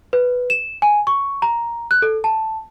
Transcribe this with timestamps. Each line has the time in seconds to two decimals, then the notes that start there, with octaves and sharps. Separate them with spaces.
0.13 B4
0.50 E7
0.82 G#5
1.07 C#6
1.42 A#5
1.91 F#6
2.02 A4
2.24 A5